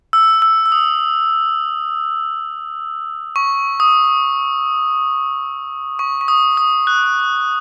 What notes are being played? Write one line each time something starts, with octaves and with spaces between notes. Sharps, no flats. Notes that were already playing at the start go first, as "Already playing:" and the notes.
E6
E6
E6
D#6
C#6
D#6
C#6
C#6
D#6
D#6
F#6